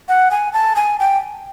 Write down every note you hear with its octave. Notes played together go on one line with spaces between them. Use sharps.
F#5
G#5
A5
G#5
G5